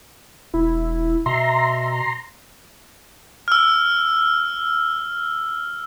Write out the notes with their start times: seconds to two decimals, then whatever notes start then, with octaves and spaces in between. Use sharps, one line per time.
0.54 E1 E4
1.26 B2 E5 A#5 C6
3.48 E6 F6